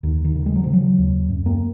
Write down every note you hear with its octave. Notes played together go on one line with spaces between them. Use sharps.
D#2 D#3
D#3
C#3
G#3
F#3
C#3 F3
F#3
D#2
F#2
A#3